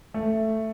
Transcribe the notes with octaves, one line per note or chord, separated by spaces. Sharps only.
A3